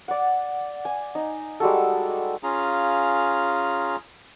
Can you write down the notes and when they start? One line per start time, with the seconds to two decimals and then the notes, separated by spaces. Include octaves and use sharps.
0.08 D5 F#5
0.85 G#5
1.15 D#4
1.60 G3 G#3 F#4 A4
2.43 C#4 F4 G#4 F5 A#5